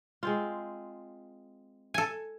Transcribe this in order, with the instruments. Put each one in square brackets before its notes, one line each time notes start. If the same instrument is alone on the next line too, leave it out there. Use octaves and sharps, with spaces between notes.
[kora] G#3 C4 F4
[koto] A4 G#5